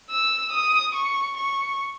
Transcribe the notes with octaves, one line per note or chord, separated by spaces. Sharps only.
E6
D#6
C#6
C#6